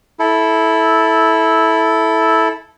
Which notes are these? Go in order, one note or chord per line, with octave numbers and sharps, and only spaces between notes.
E4 A4